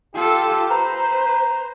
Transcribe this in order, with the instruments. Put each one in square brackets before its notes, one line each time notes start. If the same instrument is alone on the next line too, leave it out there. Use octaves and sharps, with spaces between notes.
[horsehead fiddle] F4 A4 [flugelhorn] G4
[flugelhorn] B4 [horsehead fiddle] C5 [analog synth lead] A#5